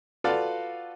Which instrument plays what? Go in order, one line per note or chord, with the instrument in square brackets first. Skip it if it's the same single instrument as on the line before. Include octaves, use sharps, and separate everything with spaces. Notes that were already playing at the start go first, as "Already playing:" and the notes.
[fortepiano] F4 F#4 A4 B4 D5 F5